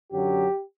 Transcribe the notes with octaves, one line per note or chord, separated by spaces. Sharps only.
F#2 D3 F#3 G4